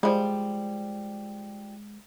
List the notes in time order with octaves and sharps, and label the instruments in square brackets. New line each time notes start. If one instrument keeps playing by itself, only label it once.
[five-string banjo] F3 G3 [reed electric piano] G#3